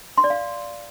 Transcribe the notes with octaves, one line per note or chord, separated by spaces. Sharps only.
C6
D5
F5